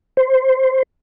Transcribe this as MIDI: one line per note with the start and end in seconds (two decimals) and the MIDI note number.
0.17 0.83 72